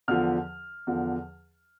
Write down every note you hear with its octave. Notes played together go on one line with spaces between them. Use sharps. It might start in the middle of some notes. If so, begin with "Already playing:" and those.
E2 D3 F3 F6
E2 D3 F3